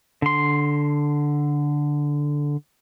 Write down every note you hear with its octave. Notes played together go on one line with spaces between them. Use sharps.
D3 C6